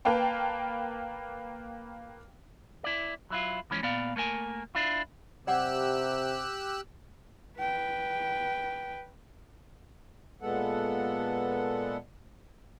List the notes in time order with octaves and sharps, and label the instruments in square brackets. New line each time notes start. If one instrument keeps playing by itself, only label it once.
[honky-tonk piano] A#3 B4 F5 G5 A5
[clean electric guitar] E4 D5
F#3 E4 F4
E3 F3 G#3 C#4
A#2 B3 D5 F5
A3 A#3 A#4 G#5
D4 E4 F4
[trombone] C3 [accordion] G4 E6 F#6 [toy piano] D5 F#5 D6
[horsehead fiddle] B4 G5
[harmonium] A#2 G#3 B3 A4 F#5